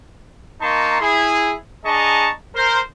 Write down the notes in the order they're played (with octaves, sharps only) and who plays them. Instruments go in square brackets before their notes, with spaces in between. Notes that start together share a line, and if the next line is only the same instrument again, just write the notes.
[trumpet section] A#3 D#4 A5 A#5 C6 C#6
E4 G#4
D4 G#4 D#5 A5 A#5 C#6
A#4 C5